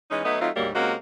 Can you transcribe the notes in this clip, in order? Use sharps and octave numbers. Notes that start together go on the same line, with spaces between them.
E3 G#3 C#4 D#4
F#3 A3 B3 D#4
F#3 A3 C4 D#4 F4
D2 G#2 F#3 G3 A#3
C3 G#3 A#3 C#4 F#4